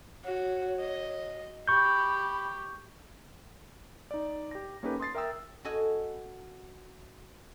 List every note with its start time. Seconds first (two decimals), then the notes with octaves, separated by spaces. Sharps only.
0.24 F#4 C#5
0.80 D#5
1.68 G4 B5 C#6 G6
4.11 D#4 D5
4.51 G4 A#6
4.83 A#3 C#4 D#4 G4 A4 B4
5.00 C6 D#6 A6 C7
5.15 A#4 E5 G5 D#6 E6
5.65 F#4 A4 D#5 G#5